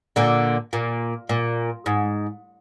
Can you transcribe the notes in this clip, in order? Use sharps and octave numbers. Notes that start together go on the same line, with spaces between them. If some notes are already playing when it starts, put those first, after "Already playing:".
A#2 D3
A#2
A#2
G#2